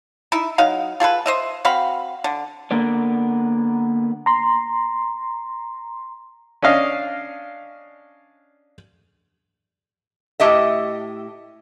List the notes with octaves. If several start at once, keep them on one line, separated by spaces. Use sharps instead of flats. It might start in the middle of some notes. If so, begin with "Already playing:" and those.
D#4 E4 E5
F#3 D#4 F5
F4 G#4 A4 B4
C5 D#5 E5
C4 F#4 F5 B5
D3
D3 A#3 B3 D5
A#5 C6
C#4 D4 D#5 F5
A2 G4 D#5 E5